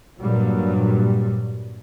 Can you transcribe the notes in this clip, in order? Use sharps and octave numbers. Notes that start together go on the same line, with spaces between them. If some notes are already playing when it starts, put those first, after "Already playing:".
G2 A#2 F#3 G3